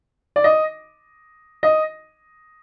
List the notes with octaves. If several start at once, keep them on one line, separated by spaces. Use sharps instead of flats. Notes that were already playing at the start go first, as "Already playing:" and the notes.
D5
D#5
D#5